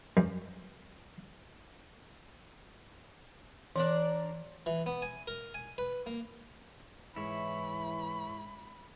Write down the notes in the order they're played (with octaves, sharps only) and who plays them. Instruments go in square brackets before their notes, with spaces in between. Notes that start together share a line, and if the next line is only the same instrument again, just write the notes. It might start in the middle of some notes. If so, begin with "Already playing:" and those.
[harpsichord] F#2
[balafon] E3 [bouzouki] D4 A#4 D5
[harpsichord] E3
B3
G#5
A#4
G#5
B4
A#3
[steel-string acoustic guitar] G#2 G#3 [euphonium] E3 [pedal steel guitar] E4 C#5 [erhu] B5